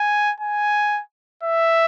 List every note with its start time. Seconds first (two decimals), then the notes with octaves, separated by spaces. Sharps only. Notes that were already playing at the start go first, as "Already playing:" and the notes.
Already playing: G#5
0.40 G#5
1.43 E5